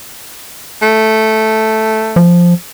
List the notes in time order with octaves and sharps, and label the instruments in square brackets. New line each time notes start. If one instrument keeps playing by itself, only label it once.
[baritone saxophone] A3
[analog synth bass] F3